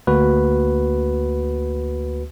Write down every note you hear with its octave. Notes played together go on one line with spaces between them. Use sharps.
D2 A#3 F#4 B4